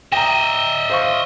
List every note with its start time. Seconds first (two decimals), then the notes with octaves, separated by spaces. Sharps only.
0.12 D#5 E5 G5 A#5
0.90 C5 F5 C#6